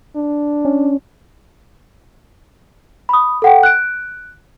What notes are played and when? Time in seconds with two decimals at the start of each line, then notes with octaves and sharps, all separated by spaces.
0.16 D4
0.65 C#4
3.09 B5 D#6
3.42 A4 F#5 G5
3.63 F#6 D7